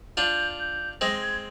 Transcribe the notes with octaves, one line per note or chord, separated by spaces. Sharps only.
D4 F4 G6
G6
G#3 C4 A#6
G#6